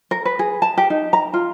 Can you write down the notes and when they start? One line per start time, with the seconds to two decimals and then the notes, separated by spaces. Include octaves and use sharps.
0.11 A#4
0.25 B4
0.39 G#4
0.62 A5
0.78 G4
0.90 D#4
1.13 A#5
1.33 F4